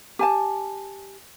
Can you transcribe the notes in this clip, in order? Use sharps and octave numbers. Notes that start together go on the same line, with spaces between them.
G4 G#5 A5